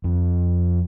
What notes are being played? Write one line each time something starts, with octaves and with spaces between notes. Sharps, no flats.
F2